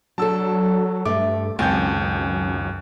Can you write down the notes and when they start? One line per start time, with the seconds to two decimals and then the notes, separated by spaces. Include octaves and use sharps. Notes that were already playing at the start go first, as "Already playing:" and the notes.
0.18 F#3 D4 A4 A5 E6
1.05 G2 A3 D6
1.59 C#2 F#2 D#3 C4 G#5 A5 G6